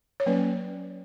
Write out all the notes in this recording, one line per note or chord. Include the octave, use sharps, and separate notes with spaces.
C#5
F#3 A#3 C#4 B4